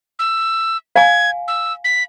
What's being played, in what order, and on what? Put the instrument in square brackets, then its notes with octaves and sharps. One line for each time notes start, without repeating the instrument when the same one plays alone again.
[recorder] E6
[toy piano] F5 G#5 [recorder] G#6
[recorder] E6
B6